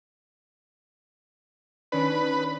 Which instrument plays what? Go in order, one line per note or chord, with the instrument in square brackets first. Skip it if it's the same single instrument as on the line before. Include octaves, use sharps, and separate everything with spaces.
[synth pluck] D#3 C#4 D4 [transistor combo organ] B4